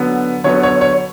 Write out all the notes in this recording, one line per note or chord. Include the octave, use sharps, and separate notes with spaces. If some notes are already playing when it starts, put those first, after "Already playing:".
Already playing: D3 F#3 B3
D3 F#3 B3 C#5
C#5
C#5